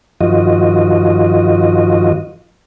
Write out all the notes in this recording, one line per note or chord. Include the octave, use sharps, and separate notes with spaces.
G2 D#3 F3 F4 F#4 D#5